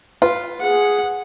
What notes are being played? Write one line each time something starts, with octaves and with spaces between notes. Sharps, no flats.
F4 B4
G#4 F#5